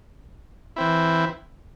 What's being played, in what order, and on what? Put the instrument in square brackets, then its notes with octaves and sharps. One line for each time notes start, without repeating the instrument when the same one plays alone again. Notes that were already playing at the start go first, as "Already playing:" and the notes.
[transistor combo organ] E3 C4 E4